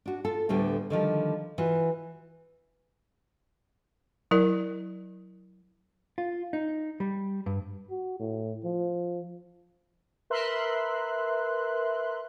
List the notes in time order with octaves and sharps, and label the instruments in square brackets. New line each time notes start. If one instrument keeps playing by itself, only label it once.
[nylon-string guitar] D4 F#4
F4 A4
D2 A2 D3 G3 B3
D3 D#3 F3 G3
E3 F4 F#4
[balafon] F#3 E4 A#4 D5
[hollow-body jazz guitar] F4
D#4
G3
G2
[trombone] F#4
A2
F3
[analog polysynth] A#4 B4 E5 C6 F#6